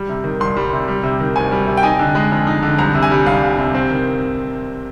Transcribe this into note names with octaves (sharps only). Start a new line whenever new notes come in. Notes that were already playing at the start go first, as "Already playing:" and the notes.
Already playing: G3
C3
D#3
C2 C6
G3
C3
G3
C3
D#3
D2 G#5
G3
C3
G5
D#4 G#5
D3
G#3
F2
D#4
D3
C2 A#5
C3
G#5
G3
C2 F5
C2
C3
C4
D#3